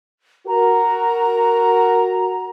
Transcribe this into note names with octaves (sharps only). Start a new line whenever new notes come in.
F#4 A#4 A#5